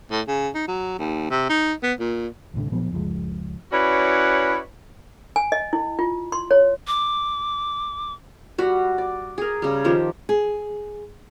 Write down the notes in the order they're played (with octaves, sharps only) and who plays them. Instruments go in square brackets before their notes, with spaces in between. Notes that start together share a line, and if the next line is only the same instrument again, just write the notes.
[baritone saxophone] A2
C#3
D#4
F#3
D#2
C3
D#4
B3
A#2
[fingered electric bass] D#1 C2 A2 D3
A#2 F3 F#3 B3
F#1 C#2 F3 G#3
[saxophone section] C#4 E4 F#4 B4 C#5 D5
[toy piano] G#5
D#5
E4
F4
C6
C#5
[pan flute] D6
[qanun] G3 F#4 B5
D5
G#4 A#4
C#3 G3
D#3 F3 G4
[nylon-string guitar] G#4